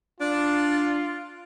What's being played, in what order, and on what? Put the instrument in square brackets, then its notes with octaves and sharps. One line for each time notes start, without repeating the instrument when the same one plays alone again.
[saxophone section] D4 [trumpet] F4